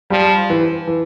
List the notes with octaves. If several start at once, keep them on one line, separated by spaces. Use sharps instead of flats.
F3 G3
E3
E3